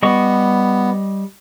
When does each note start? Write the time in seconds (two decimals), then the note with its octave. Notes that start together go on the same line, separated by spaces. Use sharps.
0.03 G3 B3 D#5 C#6